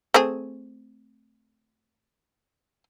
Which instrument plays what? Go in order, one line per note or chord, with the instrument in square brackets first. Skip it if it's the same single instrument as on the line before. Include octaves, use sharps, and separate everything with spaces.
[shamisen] A3 C4 G#4